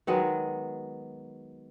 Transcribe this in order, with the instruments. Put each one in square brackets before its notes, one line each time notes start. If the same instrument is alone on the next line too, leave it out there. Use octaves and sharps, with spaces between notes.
[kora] D#3 F#3 G#3 B3